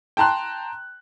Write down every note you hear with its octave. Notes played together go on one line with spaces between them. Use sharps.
G5 A5 A#5 C6 F#6